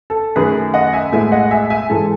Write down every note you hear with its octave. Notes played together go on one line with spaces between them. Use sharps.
A4
F#2 D#3 A3 G#4 B4
D#5 F#5
E5 G#5
A2 G#3 B3 E5 G#5
D#5 F#5
E5 G#5
E5 G#5
G#2 E3 G#3 A4